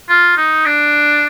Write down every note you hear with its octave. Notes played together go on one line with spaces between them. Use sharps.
F4
D#4
D4